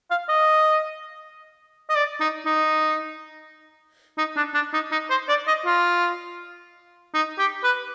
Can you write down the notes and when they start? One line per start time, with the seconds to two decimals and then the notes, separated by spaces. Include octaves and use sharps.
0.11 F5
0.29 D#5
1.90 D#5
1.96 D5
2.20 D#4
2.45 D#4
4.18 D#4
4.36 D4
4.54 D4
4.73 D#4
4.92 D#4
5.10 C5
5.29 D5
5.47 D#5
5.66 F4
7.14 D#4
7.38 G4
7.63 B4